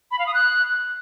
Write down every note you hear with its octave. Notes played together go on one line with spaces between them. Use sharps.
B5
F5
D#6
F#6